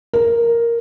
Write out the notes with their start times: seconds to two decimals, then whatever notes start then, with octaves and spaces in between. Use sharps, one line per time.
0.13 A#4